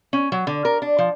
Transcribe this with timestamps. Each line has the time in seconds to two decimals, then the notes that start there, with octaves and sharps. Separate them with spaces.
0.13 C#4
0.32 F#3
0.47 D3
0.65 A#4
0.82 D4
0.98 F3